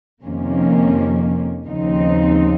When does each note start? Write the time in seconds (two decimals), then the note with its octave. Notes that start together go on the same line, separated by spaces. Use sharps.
0.24 F2 C3 D#3 A#3 C#4
1.66 D#2 C#3 F3 C4 D#4